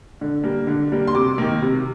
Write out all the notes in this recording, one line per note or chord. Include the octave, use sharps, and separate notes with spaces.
D3
G3 A#3
D3
G3 A#3
C6
C3 D6
D#3 A#3
C3